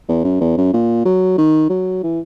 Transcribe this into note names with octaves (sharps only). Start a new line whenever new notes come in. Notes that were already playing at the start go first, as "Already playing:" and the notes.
E2
F#2
E2
F#2
A#2
F#3
D#3
F#3
E3